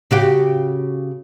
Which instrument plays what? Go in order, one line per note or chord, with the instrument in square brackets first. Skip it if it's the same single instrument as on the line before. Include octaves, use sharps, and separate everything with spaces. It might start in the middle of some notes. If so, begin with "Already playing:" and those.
[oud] C#3 F#4 G4